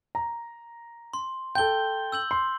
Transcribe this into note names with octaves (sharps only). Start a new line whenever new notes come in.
A#5
C6
A4 G5 G6 G7
E6 G6 F#7
C6